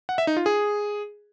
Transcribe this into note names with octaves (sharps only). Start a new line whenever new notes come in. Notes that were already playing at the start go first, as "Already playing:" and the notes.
F#5
E5
D#4
F4
G#4